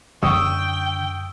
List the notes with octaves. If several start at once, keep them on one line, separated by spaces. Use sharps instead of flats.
F#2 D3 G5 C#6 D#6 E6